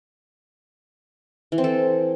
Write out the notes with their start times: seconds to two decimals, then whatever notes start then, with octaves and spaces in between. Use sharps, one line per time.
1.52 E3
1.58 C4
1.64 A4